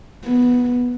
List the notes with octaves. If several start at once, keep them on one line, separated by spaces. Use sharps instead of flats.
B3